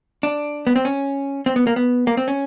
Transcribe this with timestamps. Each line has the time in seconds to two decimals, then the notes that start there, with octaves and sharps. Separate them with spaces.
0.23 D4
0.67 B3
0.76 C4
0.85 C#4
1.46 C4
1.56 B3
1.67 A#3
1.76 B3
2.07 A#3
2.17 C4
2.28 C#4